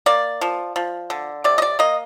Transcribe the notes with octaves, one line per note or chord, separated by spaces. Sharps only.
A#3 D5
F3
F3
D3
C3 D5
D#5
D5
A#3 D#5